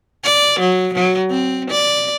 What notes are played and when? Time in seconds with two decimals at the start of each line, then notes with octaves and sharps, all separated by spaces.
0.24 D5
0.59 F#3
0.94 F#3
1.31 C4
1.70 D5